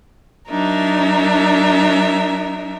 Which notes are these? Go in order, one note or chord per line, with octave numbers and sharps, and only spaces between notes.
F#3 D4 D#4 A#4 E5